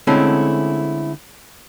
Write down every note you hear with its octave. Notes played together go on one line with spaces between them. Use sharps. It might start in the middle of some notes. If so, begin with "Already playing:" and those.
D3 G#3 A3 C4 C#4 E4